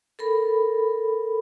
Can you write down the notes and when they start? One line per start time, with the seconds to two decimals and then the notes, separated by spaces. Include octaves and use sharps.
0.19 A4 A#4 B5